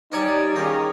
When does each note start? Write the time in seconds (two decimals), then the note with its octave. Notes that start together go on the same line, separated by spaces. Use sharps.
0.12 G3 D#4 A#4 C#5 D5 G#5
0.56 D#3 C#4 F4 G4 G#4 A#5